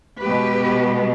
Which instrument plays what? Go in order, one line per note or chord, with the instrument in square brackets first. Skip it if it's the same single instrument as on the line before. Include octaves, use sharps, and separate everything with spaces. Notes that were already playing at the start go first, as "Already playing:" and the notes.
[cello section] B2 G#3 B3 G4 B4